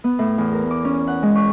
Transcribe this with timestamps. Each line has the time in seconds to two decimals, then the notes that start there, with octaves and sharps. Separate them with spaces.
0.04 B3
0.19 A2
0.38 E2
0.53 A#4
0.71 D6
0.85 C#4
1.07 F#5
1.23 G#3
1.36 C#6